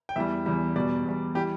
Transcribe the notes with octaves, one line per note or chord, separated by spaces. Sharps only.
G5
E2 E3 G3 E5
E2 E3 G3
E2 B2 G3 D5
E2 B2 G3
E3 G3 G4